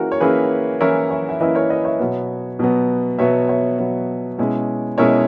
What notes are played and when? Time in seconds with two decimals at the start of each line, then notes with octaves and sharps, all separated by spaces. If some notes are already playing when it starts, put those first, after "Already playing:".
Already playing: E3 A#3 C#4 E4 F#4 G#4 A#4
0.12 C#5
0.20 E3 A#3 C#4 E4 G#4 B4
0.81 E3 A#3 C#4 E4 A#4 C#5
1.10 C#5 E5
1.29 E5
1.40 E3 A#3 C#4 E4 B4 D#5
1.55 A#4 C#5
1.69 B4 D#5
1.85 C#5 E5
1.99 B2 F#3 B3
2.59 B2 F#3 B3
3.19 B2 F#3 B3 C#5 E5
3.49 C#5 E5
3.79 B2 F#3 B3
4.38 B2 G#3 C#4 E4
4.98 B2 G#3 C#4 E4 A#4 C#5